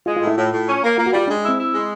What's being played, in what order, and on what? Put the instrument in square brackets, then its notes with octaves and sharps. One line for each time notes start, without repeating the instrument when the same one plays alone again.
[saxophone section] G#3 [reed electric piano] F4
[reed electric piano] F4
[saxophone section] A2
[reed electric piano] E4
[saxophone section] A2 [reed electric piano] F4
[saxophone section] A2
C#4
A#3
[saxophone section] A#3 [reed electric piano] F4
[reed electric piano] F#4
[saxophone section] G3 [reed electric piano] F4
[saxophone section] G#3 [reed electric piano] D4
[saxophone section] E4
[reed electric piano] C4
[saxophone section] E4
G#3